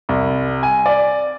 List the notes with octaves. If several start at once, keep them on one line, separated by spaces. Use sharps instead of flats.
C2
G#5
D5